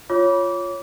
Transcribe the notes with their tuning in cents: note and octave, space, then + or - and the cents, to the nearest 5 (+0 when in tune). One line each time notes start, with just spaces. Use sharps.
F4 +0 C#5 +0 D6 -25